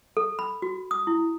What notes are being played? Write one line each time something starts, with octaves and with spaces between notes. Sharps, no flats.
A4
B5
F#4
D#6
E4